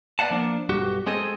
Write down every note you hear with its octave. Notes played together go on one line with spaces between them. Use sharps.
B3 D5 F5 F#5 A5
F3 A#3 D4
B1 G2 F#4 G4
G#3 C4 G#4 A4 D#5